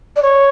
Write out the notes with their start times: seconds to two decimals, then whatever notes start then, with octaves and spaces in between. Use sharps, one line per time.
0.16 D5
0.22 C#5